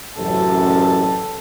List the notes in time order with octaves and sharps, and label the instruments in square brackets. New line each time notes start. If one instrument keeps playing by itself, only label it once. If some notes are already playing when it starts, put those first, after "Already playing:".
[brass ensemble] A1 F#2 C3 [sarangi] A4